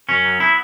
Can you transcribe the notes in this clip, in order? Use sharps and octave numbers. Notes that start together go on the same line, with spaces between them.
F#2 C#4
F#3
B3 E4